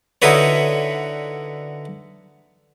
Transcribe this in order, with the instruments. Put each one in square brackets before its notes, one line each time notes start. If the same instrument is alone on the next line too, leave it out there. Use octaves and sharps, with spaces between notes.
[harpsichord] D3 D#4 E4 F#4 B4 C#5